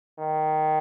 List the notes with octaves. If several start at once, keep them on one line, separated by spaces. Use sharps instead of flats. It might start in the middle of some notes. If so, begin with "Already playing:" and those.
D#3